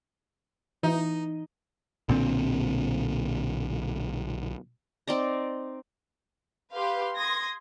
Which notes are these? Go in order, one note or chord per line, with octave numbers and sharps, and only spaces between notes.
E3 D#4
B1 A#2 D3 C4
C4 D#4 D5 A#5
G4 B4 F5 C6
C6 D#6 G#6 A#6